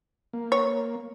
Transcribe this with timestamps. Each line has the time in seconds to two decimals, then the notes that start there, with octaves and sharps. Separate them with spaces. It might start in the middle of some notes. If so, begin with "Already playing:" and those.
0.33 A#3
0.52 C#5